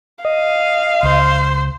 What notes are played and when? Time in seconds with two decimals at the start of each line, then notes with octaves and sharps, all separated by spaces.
0.25 D#5 F5
1.03 C#2 C5